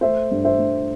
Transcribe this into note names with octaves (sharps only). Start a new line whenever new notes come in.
A3 C5 E5
G2
C5 E5
G2